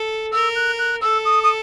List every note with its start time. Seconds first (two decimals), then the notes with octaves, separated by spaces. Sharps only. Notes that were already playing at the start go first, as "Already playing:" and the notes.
Already playing: A4
0.32 A#4 E6
0.56 F#6
0.79 F#6
1.02 A4 E6
1.25 D#6
1.44 D#6